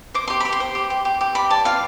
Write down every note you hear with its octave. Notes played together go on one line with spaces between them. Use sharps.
C5 D6
G4 C6
G4 B5
C6
C5
G4
G4
G4
G4
D5 B5
D5 A5
F4 F5